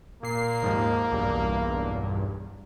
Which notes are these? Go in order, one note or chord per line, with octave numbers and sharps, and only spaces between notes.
A#2 A#3 C7
D#2 G#2 F3
B1 E2 G2